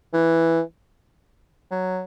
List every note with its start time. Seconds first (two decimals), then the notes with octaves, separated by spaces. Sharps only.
0.13 E3
1.71 F#3